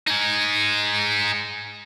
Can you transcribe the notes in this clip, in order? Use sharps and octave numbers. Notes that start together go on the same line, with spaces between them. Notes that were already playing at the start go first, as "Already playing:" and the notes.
D#4 G#4